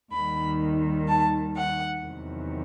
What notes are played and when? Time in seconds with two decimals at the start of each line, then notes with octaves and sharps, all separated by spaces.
0.13 D#2 D#3 G3 B5
1.08 A5
1.56 F#5
2.03 E2 C3 D#3 F#3